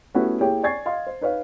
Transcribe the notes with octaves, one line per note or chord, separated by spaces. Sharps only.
A3 B3 C#4 E4 F#4 G4
A#3 E4 G4 G#4 C#5 G5
D5 G#5 C#6 G#6 A6 C7
D#5 F5 C6
C5
D#4 B4 C#5 F5